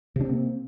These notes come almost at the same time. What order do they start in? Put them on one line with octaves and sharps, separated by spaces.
C3 D4 C4 A#3